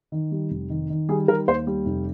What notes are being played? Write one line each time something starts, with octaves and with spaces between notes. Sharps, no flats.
D#3
G3
F1
D#3
D#3
G3 G#4
D#3 A#4
D#2 C5
G3
F1